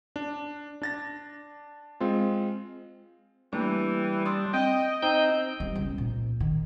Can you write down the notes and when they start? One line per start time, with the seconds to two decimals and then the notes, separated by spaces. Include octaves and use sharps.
0.16 D4
0.82 D4 A6 A#6
2.00 G#3 C4 F4
3.53 E3 G3 A3 A#3 D4
4.25 D4 C6 D#6 E6
4.53 C4 D#5 G5
5.03 C4 D#4 G5 A#5 G6
5.60 G3
5.75 C#2
5.98 A#1
6.40 D#3